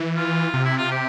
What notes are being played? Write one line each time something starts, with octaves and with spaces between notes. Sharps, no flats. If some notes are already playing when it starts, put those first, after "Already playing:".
Already playing: E3
F4
C3
E4
F4
G4